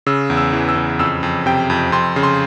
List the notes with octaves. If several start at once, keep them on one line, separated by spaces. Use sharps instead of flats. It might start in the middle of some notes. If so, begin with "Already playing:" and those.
C#3 E6
E2
E6
E3
E6
C#3
F2 E6
F2
C3 G5
F2
F2 C6
C#3
C6